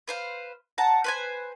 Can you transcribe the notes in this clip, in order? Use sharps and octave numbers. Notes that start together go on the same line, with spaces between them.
B4 C5 F5
F#5 A5 A#5
B4 C5 G#5